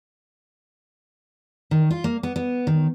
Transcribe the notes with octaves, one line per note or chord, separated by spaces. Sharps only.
D#3
F4
A#3
B3
B3
D#3